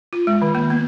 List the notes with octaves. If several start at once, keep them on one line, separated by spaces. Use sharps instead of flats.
F4
G#3
D#3
A#3
B3